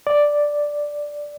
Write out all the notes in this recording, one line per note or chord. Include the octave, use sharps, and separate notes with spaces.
D5